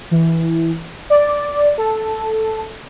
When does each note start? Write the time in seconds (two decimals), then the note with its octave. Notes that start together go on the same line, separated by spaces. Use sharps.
0.11 E3
1.10 D5
1.78 A4